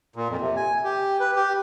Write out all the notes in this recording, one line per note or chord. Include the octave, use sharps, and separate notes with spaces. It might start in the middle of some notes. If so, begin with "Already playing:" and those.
A#2
F2
C3
G#5
G4
B4
G4